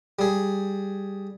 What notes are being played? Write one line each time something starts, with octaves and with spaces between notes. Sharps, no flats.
G3 G#4